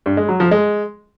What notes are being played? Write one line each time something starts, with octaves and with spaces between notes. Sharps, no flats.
G2
G#3
F#3
F3
G#3